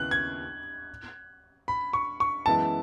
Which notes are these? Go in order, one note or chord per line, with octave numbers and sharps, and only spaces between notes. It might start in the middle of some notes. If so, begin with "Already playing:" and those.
Already playing: D#2 C#3 B3 E4 F#6
G#6
B5
C#6
C#6
F#2 E3 G#3 B3 E4 A5